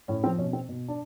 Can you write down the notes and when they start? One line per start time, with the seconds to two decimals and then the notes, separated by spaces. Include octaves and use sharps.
0.08 A2 C#4
0.23 F3 C4
0.38 B2 C#4
0.53 C4
0.69 B2
0.88 D4